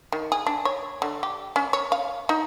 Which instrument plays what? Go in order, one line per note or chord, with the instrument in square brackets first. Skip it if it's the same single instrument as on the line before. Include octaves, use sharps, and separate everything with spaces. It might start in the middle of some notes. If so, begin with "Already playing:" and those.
[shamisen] D#3
G#4
D4
C#5
D3
G4
C#4
C#5
F5
D#4